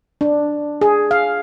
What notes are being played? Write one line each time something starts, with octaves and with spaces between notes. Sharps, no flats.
D4
G#4
F5